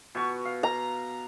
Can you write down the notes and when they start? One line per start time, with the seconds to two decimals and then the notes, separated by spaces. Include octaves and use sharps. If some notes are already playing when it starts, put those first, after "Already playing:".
0.15 B2 F#4 C#6
0.45 F5
0.63 A#5